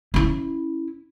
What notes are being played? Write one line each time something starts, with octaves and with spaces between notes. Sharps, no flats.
C#4 E4